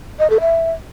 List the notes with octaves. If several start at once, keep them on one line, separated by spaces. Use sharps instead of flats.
D#5
A4
E5